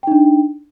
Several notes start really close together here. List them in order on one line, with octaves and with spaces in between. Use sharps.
G5 D#4 D4